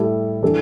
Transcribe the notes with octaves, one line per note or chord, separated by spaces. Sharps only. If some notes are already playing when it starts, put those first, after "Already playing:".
Already playing: A2 G3 E4 A4
E3 G3 D4 A4